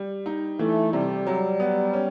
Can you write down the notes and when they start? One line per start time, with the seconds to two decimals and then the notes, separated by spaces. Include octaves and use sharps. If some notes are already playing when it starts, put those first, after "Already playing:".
Already playing: G3
0.26 D#4
0.59 E3 A3
0.93 C3 G3
1.27 F#3
1.60 B3
1.93 C#4